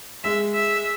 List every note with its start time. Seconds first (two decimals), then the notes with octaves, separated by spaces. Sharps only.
0.24 G#3 E5
0.54 E5